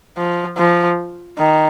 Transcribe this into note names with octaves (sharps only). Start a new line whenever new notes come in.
F3
F3
D#3